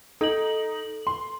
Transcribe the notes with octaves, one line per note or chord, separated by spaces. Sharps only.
D#4 A4 F#7
C6